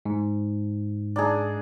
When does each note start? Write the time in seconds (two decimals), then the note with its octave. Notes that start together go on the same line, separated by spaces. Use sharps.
0.05 G#2
1.16 D4 D#4 G#4